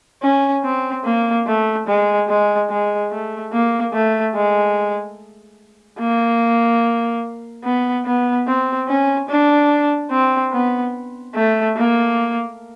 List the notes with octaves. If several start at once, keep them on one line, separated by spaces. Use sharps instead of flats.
C#4
C4
A#3
A3
G#3
G#3
G#3
A3
A#3
A3
G#3
A#3
B3
B3
C4
C#4
D4
C4
B3
A3
A#3